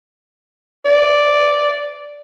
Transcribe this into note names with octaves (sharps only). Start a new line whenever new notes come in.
D5